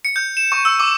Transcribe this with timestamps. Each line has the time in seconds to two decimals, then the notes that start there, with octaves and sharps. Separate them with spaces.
0.05 C#7
0.16 G6
0.37 E7
0.52 C#6
0.65 E6
0.80 D6